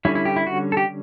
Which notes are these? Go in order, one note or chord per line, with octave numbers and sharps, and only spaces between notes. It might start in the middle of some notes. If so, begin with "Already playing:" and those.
D3 G3 C#4 E4
E4
G4
E4
F#4
A4
G4